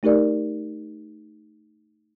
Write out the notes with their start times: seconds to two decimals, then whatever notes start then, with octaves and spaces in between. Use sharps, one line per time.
0.03 A3 D#4 G4 A#4 D5